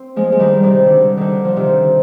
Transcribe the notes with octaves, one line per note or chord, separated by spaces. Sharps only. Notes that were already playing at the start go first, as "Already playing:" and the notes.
Already playing: C4
F3 G#3
G#3
D#3 G3
C3 D#3
D3
D3 D#3
F3
C3 D#3